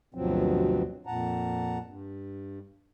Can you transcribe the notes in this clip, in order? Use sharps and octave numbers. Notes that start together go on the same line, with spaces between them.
D2 G2 B2 F3 F#3 C4
F2 A#2 F#5 A5 A#5
G2